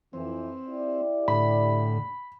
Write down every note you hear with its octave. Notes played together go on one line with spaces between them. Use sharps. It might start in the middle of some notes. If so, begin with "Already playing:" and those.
F2 E3 C4
E4 G4 D5
A2 D3 B5